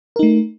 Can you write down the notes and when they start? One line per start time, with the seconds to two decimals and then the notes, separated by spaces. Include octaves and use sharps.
0.16 A#4
0.19 D#4
0.23 A3